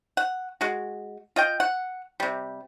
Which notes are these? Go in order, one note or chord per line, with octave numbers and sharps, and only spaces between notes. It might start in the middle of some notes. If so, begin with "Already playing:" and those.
F#5
G#3 F#4
F4 D#5 G5
F#5
C3 G3